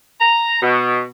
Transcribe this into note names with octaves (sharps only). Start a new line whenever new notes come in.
A#5
B2